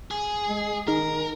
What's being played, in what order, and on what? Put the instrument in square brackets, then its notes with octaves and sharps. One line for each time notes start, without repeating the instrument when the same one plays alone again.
[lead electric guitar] G#4
[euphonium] G#3
[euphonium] D#3 [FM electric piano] D#4 G#4 [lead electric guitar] A#4